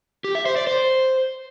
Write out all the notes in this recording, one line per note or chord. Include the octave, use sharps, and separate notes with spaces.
G4
E5
C5
D5
C5